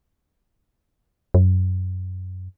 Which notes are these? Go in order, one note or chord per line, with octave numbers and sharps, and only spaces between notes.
F#2